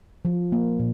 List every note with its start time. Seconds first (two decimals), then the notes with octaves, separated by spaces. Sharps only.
0.25 F3
0.52 A#3
0.79 A#2